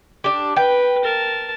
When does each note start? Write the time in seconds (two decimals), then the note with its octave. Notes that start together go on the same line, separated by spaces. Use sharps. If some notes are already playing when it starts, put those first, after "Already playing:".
0.24 D4 G4
0.56 B4 G5
1.04 A#4 A5